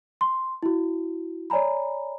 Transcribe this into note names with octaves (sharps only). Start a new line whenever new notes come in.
C6
E4 F#4
C#5 D5 G#5 A#5 B5